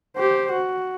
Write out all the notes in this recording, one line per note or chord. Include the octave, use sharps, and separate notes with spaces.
G4 C5
F#4